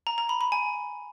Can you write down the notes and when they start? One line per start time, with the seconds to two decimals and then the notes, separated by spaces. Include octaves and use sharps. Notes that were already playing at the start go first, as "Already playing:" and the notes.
0.07 A#5
0.18 A#5
0.29 B5
0.41 B5
0.52 G#5